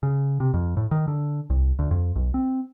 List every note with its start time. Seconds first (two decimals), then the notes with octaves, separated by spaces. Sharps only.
0.03 C#3
0.40 C3
0.54 F2
0.77 A2
0.91 D#3
1.08 D3
1.50 C2
1.79 D2
1.91 F2
2.16 B1
2.34 C4